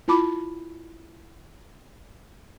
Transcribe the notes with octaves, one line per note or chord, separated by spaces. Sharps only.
E4 F4 A5 B5 D6